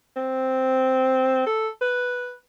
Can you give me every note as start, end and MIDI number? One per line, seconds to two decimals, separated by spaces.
0.16 1.45 60
1.47 1.68 69
1.82 2.37 71